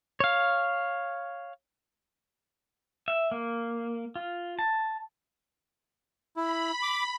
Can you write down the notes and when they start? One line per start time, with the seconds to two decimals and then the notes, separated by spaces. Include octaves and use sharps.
0.20 C#5 F5
3.08 E5
3.31 A#3
4.16 F4
4.59 A5
6.37 E4 B5
6.82 D6